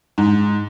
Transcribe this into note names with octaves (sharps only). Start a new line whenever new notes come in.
G#2